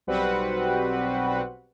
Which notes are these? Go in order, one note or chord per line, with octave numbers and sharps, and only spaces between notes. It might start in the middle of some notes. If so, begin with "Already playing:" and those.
B1 G3 C4 F#4 B4 F#5